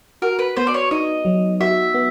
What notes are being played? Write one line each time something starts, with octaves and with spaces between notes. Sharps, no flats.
F#4 A#4
B4
B3 C5
D5
C#5
D#4 D#5
F#3
F#4 E5
B3